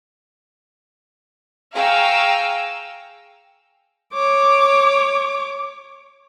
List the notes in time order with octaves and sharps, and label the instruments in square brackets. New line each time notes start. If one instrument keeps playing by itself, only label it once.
[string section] G#4 F5 G5 A#5 C#6 E6
[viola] C#5 D6